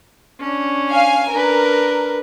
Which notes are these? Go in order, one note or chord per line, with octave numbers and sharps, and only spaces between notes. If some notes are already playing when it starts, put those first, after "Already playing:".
C#4 D4
F5 G#5
D4 A#4 B4